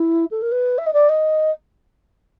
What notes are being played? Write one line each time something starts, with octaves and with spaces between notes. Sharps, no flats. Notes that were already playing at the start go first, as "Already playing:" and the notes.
Already playing: E4
A4
A#4
B4
E5
D#5
D5
D#5